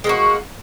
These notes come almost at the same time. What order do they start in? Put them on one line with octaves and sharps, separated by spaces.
G#3 A#3 F#4